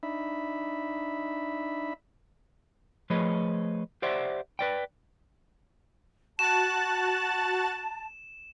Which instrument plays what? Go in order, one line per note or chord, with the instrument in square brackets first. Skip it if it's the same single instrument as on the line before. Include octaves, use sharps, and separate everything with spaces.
[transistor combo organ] D4 D#4 E5 B5
[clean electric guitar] F3 A3 G#4 B4 C#5 D#5
G4 C5 D5 E5 F#5
B4 D5 G5
[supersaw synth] F#4 F#6 A6 [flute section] A5 [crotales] E7